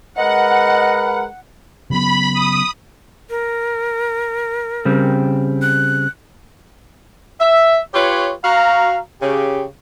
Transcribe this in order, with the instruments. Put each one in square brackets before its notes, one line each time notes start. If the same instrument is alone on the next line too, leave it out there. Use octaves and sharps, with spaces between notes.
[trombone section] G#3 A#4 B4 [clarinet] D#5 [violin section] F#5
[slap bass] C#3 F#3 B3 [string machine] B5
[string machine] D#6
[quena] A#4
[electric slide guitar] C#3 G3 C4
[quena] F#6
[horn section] E5
F4 G4 B4 C#5
F#4 F5 A#5
C#3 G4